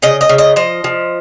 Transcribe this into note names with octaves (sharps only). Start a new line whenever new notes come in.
C#3 D#5
D#5
C#3
D#5
F3 D#5
F3